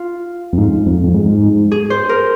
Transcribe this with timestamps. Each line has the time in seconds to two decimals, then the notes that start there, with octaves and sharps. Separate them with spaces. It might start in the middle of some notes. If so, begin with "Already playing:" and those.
Already playing: F4
0.53 F2
0.58 G#2
0.86 F2
1.04 F2
1.14 G#2
1.72 G#4
1.90 C5
2.09 A#4